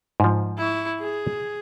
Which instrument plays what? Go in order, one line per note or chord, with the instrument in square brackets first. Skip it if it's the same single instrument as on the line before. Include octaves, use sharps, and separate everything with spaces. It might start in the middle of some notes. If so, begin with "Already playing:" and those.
[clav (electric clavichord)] G#2 F3
[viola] E4 C#6
G#4